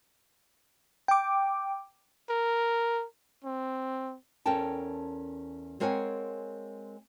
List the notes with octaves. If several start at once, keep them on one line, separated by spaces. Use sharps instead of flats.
G5 D6
A#4
C4
E2 C#4 A4 A#4 G5 A5
G#3 C4 A#4 C#5 F#5 G#5